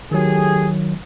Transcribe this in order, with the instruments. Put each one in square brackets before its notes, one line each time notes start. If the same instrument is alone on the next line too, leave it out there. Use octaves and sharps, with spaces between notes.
[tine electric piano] D#3 F#3 [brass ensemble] A3 G4 G#4